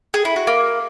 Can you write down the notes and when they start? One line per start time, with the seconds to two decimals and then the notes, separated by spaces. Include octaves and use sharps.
0.14 G#4
0.25 E4
0.36 F#4
0.47 A#3